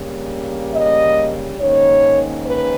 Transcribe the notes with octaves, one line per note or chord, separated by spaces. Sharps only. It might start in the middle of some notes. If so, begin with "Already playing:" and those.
Already playing: C#3 G3 A#3
D#5
G#2 D#3 A#3 C#4 C#5
B4